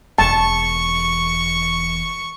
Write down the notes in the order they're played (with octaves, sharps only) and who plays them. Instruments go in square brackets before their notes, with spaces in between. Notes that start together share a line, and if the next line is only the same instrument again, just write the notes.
[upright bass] E1 E2 [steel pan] A5 [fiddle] C#6